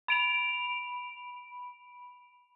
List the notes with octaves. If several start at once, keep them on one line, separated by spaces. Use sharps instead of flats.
B5 D7 F7